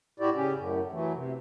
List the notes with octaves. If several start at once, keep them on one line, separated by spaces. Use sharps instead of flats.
A2 E4 F#4 G4 D5
C#3 C#4 G4
F#2 A2
E3 F#3 A3
C3